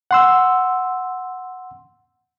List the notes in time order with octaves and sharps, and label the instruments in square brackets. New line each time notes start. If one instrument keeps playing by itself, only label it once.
[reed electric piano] F#5 C6 E6